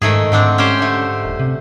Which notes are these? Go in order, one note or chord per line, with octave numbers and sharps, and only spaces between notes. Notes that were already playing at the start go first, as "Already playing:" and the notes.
G#2 D#3 A3 G#4
G#2 D3 C4 D4
C#4 G4 C5
D3 A3
D#1
C3